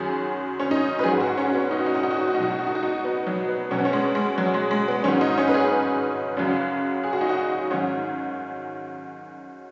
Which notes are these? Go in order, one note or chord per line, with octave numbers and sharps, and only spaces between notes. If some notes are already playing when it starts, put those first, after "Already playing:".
Already playing: F#2 D#3 F#3 G#4
C#4
D#4
B4
G#2 F#3 G#4
F#4
C#4
B3
D#4
F#4
D#4
F#4
D#4
F#4
D#4
F#4
D#4
B2 F#3 F#4
D#4
F#4
D#4
F#4
D#4
B3
F#3
B3
B2 F#3 C#4
B3
C#4
G#3
G#3
F#3
G#3
G#3
B3
G#2 D#3 F#3 C#4
D#4
C#4
B4
G#4
F#2 C#3 F#3
G#4
F#4
D#4
F#4
G#2 D#3 F#3 C#4